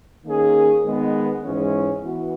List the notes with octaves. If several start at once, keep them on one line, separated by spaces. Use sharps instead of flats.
D#3 A#3 C#4 G#4
D#3 G#3 B3
G#2 E3 G#3 C#4
E3 B3 F#4